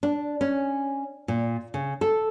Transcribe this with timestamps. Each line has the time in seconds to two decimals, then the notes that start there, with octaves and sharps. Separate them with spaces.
0.03 D4
0.41 C#4
1.28 A#2
1.74 C#3
2.01 A4